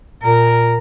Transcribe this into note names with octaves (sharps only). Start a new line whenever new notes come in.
A#2 A#4